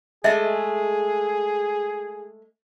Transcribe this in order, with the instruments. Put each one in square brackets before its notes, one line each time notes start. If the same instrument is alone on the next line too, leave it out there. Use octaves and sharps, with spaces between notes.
[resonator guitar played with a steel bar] G#3 A3 [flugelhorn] G#4 [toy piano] D#5 E5